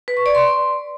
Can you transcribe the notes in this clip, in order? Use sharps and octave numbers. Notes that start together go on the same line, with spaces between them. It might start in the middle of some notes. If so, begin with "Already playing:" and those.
B4
C#6
D5
C6